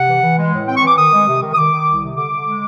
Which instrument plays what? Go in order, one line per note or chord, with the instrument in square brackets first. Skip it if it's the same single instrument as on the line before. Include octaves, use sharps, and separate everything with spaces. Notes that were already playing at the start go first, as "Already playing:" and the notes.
Already playing: [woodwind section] C3 F#5
E3
E3
G#3
A2
C4 G5
C#6
E3 D6
D#3 D#6
G#3
C3
D#3
D#6
D#3 D6
D#3
C2
C3
D3 D6
D3
G#3